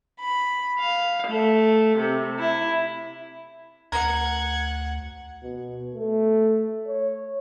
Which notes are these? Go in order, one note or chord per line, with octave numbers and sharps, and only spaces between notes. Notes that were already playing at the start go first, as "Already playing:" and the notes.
B5
F5
A3
C3
E4
D2 A#4 F#5 G#6
B2
A3
C#5